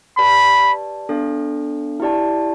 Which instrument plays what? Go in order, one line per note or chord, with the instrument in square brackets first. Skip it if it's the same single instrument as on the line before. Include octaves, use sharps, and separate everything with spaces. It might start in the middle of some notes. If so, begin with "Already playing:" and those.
[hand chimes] G4 B4 D5 A5 [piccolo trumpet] B5
[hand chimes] B3 D4 A4
E4 G4 D5 A5